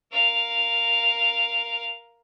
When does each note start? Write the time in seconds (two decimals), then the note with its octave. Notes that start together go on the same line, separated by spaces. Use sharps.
0.12 A#4 F5